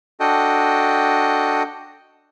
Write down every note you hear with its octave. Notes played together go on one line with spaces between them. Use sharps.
D4 F#4 A4 D#5 G5